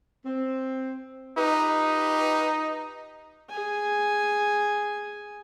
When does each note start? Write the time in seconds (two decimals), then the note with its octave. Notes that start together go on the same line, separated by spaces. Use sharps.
0.26 C4
1.37 D#4 F4 G4 B4
3.50 G#4 G#5